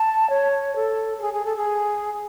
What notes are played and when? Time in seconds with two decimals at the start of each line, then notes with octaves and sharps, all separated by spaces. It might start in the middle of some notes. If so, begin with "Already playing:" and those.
Already playing: A5
0.30 C#5
0.76 A4
1.18 A4
1.22 G#4
1.34 G#4
1.45 A4
1.56 G#4